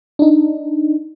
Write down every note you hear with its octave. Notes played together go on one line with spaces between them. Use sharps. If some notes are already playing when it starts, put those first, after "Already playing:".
D4 D#4